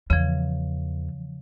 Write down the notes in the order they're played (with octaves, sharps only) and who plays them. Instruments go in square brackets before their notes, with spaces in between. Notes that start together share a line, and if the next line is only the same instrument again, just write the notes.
[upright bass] E2 [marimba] C#3 F3